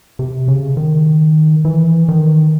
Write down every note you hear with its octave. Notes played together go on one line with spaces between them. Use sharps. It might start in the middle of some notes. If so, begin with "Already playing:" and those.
C3
C#3
D#3
E3
D#3